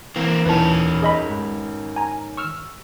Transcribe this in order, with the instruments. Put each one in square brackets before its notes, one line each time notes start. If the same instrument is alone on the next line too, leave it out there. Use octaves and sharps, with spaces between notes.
[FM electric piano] E3 [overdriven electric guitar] A#3 C4
[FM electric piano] D#2 A#2 E3 [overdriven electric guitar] D#3 C#4 [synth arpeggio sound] B4 A5
[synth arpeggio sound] G#4 D#5 B5
[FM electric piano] G#2
[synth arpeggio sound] G#5 A#5
C#6 E6 F6